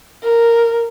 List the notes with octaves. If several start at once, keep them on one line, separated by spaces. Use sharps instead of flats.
A#4